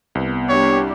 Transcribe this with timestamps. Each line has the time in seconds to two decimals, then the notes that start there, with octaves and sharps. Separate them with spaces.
0.15 C2 B3
0.49 G3 D4 G4 C#5